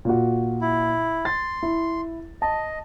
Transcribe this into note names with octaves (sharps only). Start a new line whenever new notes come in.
A#2 F#4
E4
C6 A6
E4
D#5 A5